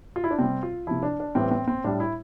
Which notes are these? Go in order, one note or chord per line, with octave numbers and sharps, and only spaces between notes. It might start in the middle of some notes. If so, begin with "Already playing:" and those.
F4
E4
D4
C3 G3 C4
F4
C3 F3 E4
D4
D4
A2 E3 G3 C4
C4
C4
A2 G3 D4
E4